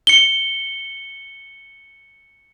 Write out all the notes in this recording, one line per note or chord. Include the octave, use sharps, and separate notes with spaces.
C#7 G7